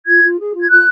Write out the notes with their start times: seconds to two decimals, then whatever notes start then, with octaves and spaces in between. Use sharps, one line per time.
0.06 F4 G#6
0.22 F4
0.38 G#4
0.53 F4
0.59 G#6
0.69 F4 F#6